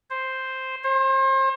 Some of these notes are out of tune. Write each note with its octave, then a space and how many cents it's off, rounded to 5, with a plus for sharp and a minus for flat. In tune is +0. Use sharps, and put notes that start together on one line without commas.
C5 +0
C5 +35